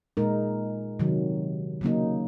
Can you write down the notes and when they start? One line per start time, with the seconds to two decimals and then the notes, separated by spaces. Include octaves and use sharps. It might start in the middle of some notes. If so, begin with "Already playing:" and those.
0.17 A#2 G#3 D#4 A#4
0.99 C3 D#3 F#3
1.81 C#3 F#3 A#3 D#4